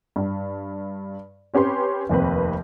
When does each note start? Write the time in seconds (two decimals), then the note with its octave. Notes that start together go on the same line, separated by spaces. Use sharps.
0.16 G2
1.54 C4 C#4 G4 B4 C6
2.09 F1 D#2 C4 B4